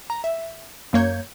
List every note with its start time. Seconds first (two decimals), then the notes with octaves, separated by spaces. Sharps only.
0.10 A#5
0.24 E5
0.93 F#2 A#3 C#5 G6 G#6